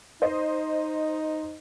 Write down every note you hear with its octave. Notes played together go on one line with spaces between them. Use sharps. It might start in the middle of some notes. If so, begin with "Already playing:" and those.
D#4 C5 D#5